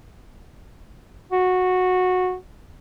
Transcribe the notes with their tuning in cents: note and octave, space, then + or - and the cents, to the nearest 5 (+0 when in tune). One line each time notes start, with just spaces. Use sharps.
F#4 -15